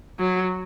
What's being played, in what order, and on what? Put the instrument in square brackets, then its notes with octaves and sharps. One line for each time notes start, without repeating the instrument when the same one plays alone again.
[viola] F#3